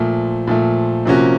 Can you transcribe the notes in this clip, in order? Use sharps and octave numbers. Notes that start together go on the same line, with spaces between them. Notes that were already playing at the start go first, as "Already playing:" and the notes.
Already playing: A#2 F3 A3
A#2 F3 A3
C3 F3 A#3 C#4 F#4